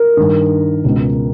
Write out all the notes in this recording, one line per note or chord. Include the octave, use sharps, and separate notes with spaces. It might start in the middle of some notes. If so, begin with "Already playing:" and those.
Already playing: A#4
G2 D#3
C#2 B2